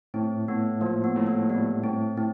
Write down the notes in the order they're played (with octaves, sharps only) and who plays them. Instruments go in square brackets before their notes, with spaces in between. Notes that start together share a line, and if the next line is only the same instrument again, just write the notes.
[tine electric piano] A2 [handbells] C4
[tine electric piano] A2 [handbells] B3
[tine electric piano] F3 [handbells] A#3
[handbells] B3
[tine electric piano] A2
[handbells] A#3
[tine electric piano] G3 [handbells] B3
[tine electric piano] A2 [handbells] C4
[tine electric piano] A2 [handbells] C4